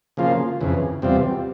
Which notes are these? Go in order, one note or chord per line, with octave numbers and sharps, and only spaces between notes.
C#3 F3 A#3 F4
F2 C#3 E3
E2 C3 G3 C4 F4